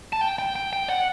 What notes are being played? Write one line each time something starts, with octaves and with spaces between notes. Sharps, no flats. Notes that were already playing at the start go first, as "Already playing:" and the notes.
A5
G5
G5
G5
G5
F#5